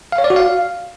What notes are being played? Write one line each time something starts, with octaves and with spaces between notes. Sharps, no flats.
F5
C#5
D5
F#4
F5